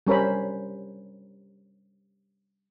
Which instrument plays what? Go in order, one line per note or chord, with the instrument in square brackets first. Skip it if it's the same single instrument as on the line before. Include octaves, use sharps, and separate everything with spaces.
[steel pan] G3 C#4 A#4 C5 B5